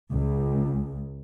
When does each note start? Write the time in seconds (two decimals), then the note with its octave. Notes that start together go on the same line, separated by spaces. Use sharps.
0.12 C#2